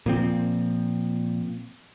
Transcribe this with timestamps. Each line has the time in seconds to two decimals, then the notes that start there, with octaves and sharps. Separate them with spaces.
0.06 A#2 F3 C4